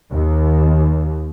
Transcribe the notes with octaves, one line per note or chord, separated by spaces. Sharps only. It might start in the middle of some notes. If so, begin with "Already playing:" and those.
D#2